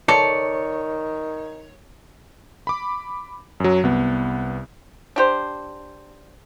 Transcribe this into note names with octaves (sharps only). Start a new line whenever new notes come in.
D#3 A4 C#5 D5 C#7
B5 D6
F#2 F#3
C2 B3
D4 G4 C5